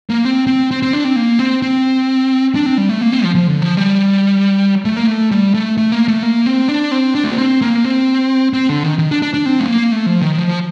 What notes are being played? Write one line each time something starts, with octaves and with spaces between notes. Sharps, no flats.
A#3
C4
C4
C4
C4
D4
C4
A#3
C4
C4
D4
C4
G3
A3
A#3
C4
F3
F3
D3
F3
G3
A3
A#3
A3
G3
A3
A3
A#3
A3
A#3
C4
D4
C4
D4
A3
A#3
C4
A#3
C4
C4
D3
D#3
D#3
D4
D4
D4
C4
A3
A#3
A3
F3
D#3
F3